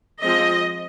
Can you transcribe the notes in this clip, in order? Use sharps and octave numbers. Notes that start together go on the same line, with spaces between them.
F3 G#3 C4 D#5